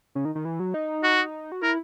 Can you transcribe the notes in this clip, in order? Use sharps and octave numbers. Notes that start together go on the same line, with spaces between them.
C#3
D#3
D#3
E3
F#3
D#4
F#4
F#4
E4 A#4